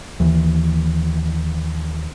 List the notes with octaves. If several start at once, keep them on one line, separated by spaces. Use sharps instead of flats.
D#2 E3